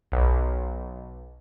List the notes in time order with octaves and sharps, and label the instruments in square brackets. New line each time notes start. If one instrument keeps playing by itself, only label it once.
[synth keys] B1